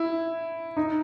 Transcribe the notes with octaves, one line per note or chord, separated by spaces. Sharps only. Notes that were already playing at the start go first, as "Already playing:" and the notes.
Already playing: E4
D#4